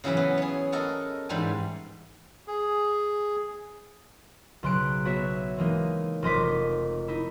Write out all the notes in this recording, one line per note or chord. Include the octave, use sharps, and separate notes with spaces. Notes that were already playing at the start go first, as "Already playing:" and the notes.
C#3 E3 F#3 C#4 B4
B3
G#4 C#5
F#4 A4 A#4 D#5
G#2 E3 G3 G#5
G#4
B1 C#3 C6 F#6 D7
B3 F#4 C#5 E5
E3 G#3 A#3 D#4
F1 A#4 D#5 C6 D6 B6
D#4 E4